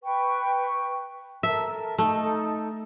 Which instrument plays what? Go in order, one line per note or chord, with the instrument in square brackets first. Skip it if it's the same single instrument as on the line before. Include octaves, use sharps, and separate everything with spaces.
[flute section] B4 G5 C#6
[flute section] A4 A#4 A5 [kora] E5
[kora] A3 [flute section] D#4 A4